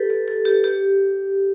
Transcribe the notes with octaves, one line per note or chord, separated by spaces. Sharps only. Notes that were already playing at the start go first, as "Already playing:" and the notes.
Already playing: G4 A4 B4
A4
A4
G4
G4